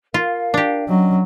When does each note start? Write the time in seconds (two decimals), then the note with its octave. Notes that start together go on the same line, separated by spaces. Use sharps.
0.14 F4 A#4 F5
0.54 D4 G4
0.89 F#3 C#4 D#5